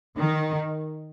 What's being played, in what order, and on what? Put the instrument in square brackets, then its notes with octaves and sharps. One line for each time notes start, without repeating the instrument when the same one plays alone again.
[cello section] D#3